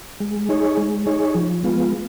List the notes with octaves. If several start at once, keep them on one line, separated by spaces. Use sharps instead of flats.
G#3
D#4 G#4 C#5
G#3
D#4 G#4 C#5
F3
G#3 B3 F4